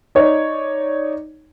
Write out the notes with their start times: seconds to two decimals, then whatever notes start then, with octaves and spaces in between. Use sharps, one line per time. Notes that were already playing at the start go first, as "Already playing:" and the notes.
0.15 D#4 C#5 D5